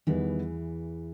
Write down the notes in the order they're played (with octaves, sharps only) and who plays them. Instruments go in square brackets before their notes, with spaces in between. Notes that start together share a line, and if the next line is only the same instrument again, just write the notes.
[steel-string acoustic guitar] E2 E3 [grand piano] D#3 G3 B3